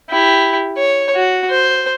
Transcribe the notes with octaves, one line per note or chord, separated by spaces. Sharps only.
E4 G4
C#5
F#4
C5